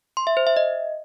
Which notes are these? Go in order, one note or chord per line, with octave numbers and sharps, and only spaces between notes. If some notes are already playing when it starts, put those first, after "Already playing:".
C6
E5
C5
E5
D#5